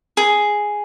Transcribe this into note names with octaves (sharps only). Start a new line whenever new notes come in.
G#4